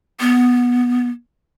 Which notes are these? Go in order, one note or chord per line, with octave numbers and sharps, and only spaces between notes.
B3